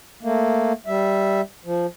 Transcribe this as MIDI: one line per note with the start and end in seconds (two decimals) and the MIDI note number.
0.23 0.72 57
0.23 0.72 58
0.87 1.41 55
0.87 1.41 76
1.65 1.86 53